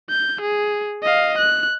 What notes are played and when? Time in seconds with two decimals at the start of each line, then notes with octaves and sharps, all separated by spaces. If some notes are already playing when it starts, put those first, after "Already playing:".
0.10 G6
0.42 G#4
1.03 D#5 F5
1.39 F#6